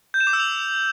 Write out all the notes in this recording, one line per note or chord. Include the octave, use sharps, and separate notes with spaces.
G6
E7
D6
E6
F7